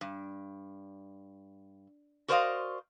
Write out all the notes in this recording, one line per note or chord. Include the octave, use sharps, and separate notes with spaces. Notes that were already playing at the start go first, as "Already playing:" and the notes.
G2
F#4 A#4 C5 D5 D#5 F5